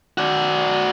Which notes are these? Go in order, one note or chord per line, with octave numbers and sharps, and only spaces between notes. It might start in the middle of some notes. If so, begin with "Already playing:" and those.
F#4 D5